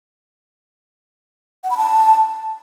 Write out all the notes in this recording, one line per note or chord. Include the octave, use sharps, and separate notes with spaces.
F#5
B5
A5